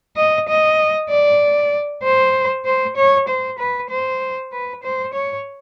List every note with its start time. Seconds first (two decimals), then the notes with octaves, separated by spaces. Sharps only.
0.17 D#5
0.48 D#5
1.10 D5
2.03 C5
2.65 C5
2.96 C#5
3.28 C5
3.58 B4
3.89 C5
4.52 B4
4.83 C5
5.14 C#5